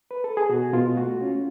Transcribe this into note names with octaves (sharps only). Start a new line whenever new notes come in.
B4
A4
G#4
B2 F#4
B2 F4
A3 F#4
C#4 F4